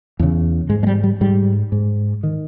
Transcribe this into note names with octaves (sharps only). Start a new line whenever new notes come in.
E2 C#3
G#2 G#3
G#3
G3
G3
G#2 G3
G#2
D#3